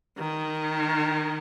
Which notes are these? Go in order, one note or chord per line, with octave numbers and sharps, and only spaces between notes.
D#3